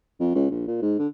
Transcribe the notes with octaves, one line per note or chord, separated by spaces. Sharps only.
F2
C#2
A#1
A#2
G#2
D3